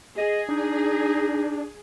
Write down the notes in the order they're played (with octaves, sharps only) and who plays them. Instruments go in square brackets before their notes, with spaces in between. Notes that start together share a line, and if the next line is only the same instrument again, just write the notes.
[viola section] G#4 [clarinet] D#5
[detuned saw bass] D4 [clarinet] D#4